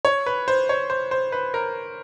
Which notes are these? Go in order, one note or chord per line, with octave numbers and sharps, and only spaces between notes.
C#5
B4
C5
C#5
C5
C5
B4
A#4